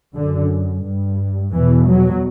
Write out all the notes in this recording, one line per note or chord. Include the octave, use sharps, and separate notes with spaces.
F#2 D3
G2
E2 B2 E3
F#3